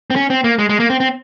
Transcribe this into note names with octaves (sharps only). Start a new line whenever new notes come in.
C4
C#4
C4
A#3
G#3
G#3
A#3
C4
C4